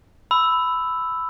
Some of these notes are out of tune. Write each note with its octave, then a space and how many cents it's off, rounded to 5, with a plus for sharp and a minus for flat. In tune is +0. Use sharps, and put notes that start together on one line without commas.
B5 +15 E6 +0